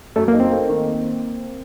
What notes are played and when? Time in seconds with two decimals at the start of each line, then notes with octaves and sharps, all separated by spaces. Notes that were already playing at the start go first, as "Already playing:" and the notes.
0.16 F#2 A3
0.28 A#3
0.33 D#4
0.40 C4
0.52 A3
0.69 D#3